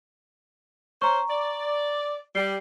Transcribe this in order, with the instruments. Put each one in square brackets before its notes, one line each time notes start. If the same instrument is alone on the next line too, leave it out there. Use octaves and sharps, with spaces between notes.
[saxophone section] C#4 C5 [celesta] A#5 C#6
[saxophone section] D5
[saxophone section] G3 [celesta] C7